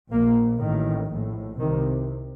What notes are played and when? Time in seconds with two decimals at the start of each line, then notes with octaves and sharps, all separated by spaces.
0.12 A#1 A#2 A#3
0.60 A1 A2 D#3
1.11 A#1 A2
1.60 C2 C3 D#3